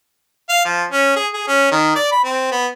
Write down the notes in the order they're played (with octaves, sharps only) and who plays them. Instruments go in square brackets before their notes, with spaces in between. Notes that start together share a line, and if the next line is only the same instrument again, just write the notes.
[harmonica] F5
F3
C#4
G#4
G#4
C#4
D#3
D5
B5
C4
B3